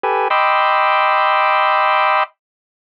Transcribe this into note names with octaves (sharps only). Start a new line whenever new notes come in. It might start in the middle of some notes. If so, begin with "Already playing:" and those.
G4 A4 B4 G#5
D#5 G5 B5 C6 D6 E6